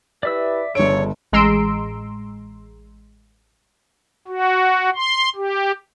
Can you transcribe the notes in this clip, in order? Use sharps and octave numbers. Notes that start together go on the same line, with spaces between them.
E4 G4 B4 D5 E5 E6
G1 C#3 F3 D4 A4 C#5 D7
A1 G#3 A#5 C6 E6 D7
F#4
C6
G4